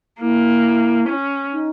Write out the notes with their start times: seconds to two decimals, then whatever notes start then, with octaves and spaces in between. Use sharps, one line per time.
0.21 A#3 E4
1.09 C#4
1.53 D#4